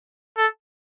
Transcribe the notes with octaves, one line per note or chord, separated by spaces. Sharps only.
A4